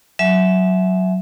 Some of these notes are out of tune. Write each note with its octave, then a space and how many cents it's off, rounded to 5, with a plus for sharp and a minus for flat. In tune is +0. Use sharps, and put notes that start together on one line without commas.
F#3 +5 E5 +0 G#5 +35